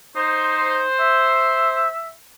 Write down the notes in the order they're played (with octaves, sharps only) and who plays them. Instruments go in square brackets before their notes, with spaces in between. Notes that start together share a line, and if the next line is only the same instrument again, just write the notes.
[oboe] D#4 [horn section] C5
[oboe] E5